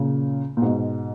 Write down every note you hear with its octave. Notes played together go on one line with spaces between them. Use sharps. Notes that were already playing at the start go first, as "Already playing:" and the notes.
Already playing: A#2 C#3
A#2
G#2 B2